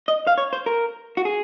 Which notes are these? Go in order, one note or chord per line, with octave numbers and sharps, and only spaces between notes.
D#5
F5
C#5
C5
A#4
F#4
G#4